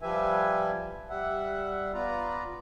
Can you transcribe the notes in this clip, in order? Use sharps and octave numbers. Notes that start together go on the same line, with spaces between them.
F3 G3 G4 B4 E5 G#5
G3 E5 F#5
B3 F4 B4 D5 A#5